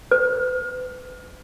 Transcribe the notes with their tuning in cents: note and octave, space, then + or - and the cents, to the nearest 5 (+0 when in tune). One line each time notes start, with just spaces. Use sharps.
B4 +35